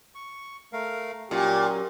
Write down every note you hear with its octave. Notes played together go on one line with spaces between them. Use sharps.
C#6
A3 A#4 F5
A#2 F#3 C#4 G4